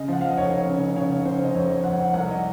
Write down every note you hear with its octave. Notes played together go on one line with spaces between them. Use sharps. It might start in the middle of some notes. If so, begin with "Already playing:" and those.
Already playing: C#3 D#5
F3 F#5
F5
D#5
F1 C#5
C#3
C#3 C#5
C#3 C5
D#5
F2 C#5
F2 F#5
F#5
C2 F#5
D#5